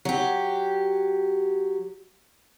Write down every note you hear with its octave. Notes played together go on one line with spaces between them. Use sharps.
F#3 G4